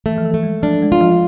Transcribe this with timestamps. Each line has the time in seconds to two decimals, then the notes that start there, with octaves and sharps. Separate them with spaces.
0.06 E3 A3
0.18 F3
0.25 E3
0.34 A3
0.43 G#3
0.63 F3 D4
0.82 G#3
0.92 F4
1.01 F3